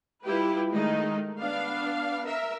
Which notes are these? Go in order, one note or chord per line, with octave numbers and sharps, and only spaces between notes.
G3 E4 F4 G4 B4
D#3 G#3 A3 D#4
B3 D4 F5
A#4 E5